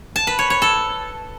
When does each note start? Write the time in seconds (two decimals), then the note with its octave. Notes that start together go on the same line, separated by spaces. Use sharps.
0.16 A5
0.27 B4
0.39 C#5
0.50 C#5
0.62 A4